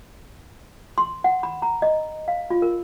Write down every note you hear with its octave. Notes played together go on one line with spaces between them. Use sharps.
C6
F#5
B5
A#5
D#5
F5
F4
A#4